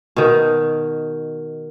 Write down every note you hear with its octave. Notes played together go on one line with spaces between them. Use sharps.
B2 D#3